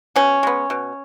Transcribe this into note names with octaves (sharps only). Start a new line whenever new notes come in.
B2 C#4
G#3 B3
B2